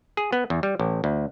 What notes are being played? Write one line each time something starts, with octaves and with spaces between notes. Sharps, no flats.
G#4
B3
E2
G3
A1
D2